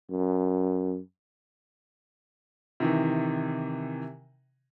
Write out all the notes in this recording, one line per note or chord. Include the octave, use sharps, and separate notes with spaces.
F#2
C3 D#3 E3